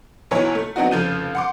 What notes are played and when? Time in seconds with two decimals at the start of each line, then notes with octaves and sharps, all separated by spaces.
0.31 B1 E3 F#3 E4 C#5 G#5
0.55 A3
0.76 F#3 B3 C4 D4 D#4 F#4
0.91 F1 C#3 F3 G6 D#7
1.35 F#5 C6 D6